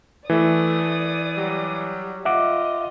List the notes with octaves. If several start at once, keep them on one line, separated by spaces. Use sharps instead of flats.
E3 A3 D5 D#6
F#3 G3
F4 D#5 E5 F#5 D6